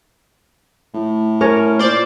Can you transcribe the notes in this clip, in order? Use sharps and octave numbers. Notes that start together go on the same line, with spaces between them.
A2
C#4 A#4 C#5
A#2 C5 D5